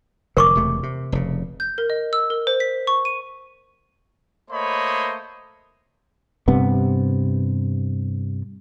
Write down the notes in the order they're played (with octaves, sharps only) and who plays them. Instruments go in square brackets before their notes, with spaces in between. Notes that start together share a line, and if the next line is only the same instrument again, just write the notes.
[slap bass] F1 D3 [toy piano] A#4 C#6 D6
[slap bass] E1 C3 A3
C3
F1 C#3
[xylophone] G6
A#4
D#5
E6
A#4
C5
B6
C#6
D#7
[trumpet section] A3 A#3 C5 C#5 D#5 B5
[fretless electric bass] G2 C3 B3